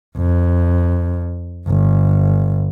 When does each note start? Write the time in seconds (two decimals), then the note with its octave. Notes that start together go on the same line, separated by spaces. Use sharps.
0.17 F2
1.67 G1